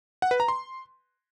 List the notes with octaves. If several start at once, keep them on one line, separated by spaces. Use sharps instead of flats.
F#5
B4
A#5
C6